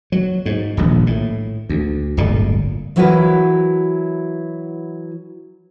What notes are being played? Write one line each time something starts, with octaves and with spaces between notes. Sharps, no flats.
F#3
G#2
D#1 A#1
A2
D2
D1 G1 A#2 D3
E3 F#3 E4 F#4 A#4 B4